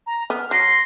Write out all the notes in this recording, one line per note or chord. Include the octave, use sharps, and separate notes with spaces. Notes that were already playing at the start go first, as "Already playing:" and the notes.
A#5
B3 F6
F#3 C6 A#6